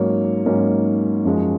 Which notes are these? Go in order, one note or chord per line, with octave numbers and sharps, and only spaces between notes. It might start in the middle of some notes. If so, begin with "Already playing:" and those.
Already playing: G#2 F#3 A#3 C#4 C#5
G#2 F#3 A#3 C#4
F#2 F3 G#3